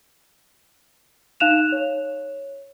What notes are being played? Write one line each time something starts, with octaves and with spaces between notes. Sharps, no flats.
D#4 F5 F#6 E7 F7
C#5